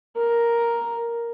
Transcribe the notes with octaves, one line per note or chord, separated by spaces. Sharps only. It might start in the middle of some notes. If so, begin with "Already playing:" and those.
A#4